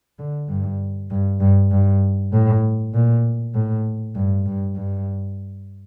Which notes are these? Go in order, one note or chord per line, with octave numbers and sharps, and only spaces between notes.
D3
G2
G2
G2
G2
A2
A#2
A2
G2
G2
G2